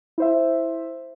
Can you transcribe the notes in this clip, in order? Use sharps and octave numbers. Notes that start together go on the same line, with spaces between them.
E4 C5 E5